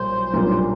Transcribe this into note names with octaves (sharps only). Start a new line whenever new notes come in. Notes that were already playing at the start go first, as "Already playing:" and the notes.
Already playing: B1 A#2 G3 A#3 C5
B1 A#2 G3 A#3 D4